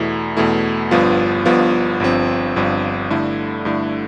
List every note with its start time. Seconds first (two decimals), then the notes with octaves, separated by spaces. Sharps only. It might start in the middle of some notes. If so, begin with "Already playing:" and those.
Already playing: E2 B2 A3 E4
0.37 E2 B2 A3 E4
0.91 G1 G2 F3 B3 F4
1.46 G1 G2 F3 B3 F4
2.00 G1 G2 F3 C4
2.56 G1 G2 F3 C4
3.10 G2 D3 A3 E4
3.65 G2 D3 A3 E4